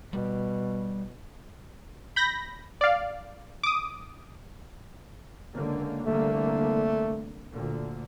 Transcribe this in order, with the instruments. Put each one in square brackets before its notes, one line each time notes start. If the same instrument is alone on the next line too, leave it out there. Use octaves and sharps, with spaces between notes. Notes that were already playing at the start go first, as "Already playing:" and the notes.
[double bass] B2 [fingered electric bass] G3
[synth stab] B5 G6 A#6
D5 F5
D6 D#6
[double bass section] C#2 D3 A#3
[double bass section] C2 D3 A#3 [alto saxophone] A3
[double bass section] D2 A#2 D3